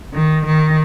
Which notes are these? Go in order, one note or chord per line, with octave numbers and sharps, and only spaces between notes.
D#3
D#3